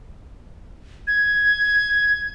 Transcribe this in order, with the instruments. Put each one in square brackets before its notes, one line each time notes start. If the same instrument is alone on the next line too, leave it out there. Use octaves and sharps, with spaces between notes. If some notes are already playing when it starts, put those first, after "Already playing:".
[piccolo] G#6